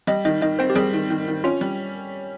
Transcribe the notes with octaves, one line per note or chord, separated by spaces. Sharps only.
G3 D#5
D#3 D#5
D#3 D#5
C4 C5
G4
G3 G#4
D#3
D#3
D#3
C#4 F4
G3